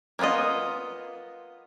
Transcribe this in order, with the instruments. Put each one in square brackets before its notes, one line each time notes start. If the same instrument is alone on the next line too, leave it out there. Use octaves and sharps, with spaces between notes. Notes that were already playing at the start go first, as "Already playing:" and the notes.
[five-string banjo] A#3 B3 D#4 F4 D#5